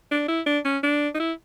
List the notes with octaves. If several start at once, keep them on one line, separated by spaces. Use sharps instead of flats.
D4
E4
D4
C#4
D4
D#4
E4